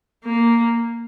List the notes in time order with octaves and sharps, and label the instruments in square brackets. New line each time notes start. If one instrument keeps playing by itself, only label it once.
[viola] A#3